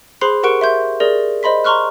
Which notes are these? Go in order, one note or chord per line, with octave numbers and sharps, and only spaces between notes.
G#4 C5 B5 C6 F#6 C7
G4 A#4 F#5 C#6 F#6 D7
E5 C6 G6
G#4 A#4 D5 A#6
C5 D#5 B5 C6 B6
A#5 C6 C#6 F6 F#6